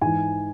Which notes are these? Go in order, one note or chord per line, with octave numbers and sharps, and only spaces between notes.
G#2 E3 G#5